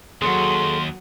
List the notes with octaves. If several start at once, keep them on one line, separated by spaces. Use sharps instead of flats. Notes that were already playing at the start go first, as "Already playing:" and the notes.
D#2 F#3 G#4 A4 C6